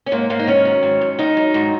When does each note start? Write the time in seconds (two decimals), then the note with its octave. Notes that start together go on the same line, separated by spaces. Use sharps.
0.06 C#4
0.12 G#2 A#3
0.30 G#2 A#3
0.39 D#4
0.47 D#3 C#4
0.65 F#3
0.83 G#2
1.01 G#2
1.19 D#3 D#4
1.37 F#3
1.54 G#2